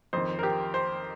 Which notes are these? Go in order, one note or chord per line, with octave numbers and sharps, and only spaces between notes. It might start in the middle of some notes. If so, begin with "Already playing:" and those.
F2 D#3 C5
A#4
G4
C5